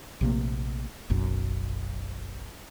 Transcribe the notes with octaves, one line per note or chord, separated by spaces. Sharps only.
A#1 C3 A3 A#3
F#1 B1 F#2